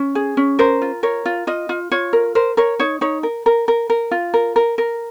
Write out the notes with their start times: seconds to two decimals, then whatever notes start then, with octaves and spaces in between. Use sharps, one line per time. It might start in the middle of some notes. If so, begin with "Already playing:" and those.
Already playing: C#4
0.15 G#4
0.37 C#4
0.59 A#4 C5
0.82 F4
1.03 A#4 C#5
1.26 F4
1.47 F4 D#5
1.69 F4
1.91 F4 C#5
2.13 A#4
2.35 A#4 C5
2.57 A#4 C#5
2.80 D#4 C#5
3.01 D#4 C#5
3.23 A#4
3.46 A#4
3.68 A#4
3.90 A#4
4.11 F4
4.34 A#4
4.56 A#4
4.78 A#4